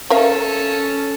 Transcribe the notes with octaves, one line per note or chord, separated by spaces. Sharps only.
C#4 A4 A#4 E5 F5